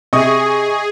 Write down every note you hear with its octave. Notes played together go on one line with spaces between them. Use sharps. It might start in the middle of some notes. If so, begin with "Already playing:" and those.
C3 G#4 D#5 C#6 D#6